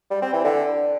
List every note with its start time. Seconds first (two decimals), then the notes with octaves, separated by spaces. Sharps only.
0.11 G3
0.22 C4
0.33 E3
0.44 D3